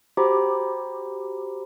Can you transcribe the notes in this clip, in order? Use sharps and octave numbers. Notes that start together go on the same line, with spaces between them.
F#4 G4 C5 A#5 B5 D6